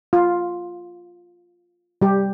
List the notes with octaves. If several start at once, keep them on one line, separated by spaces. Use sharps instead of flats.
F4
G3 G4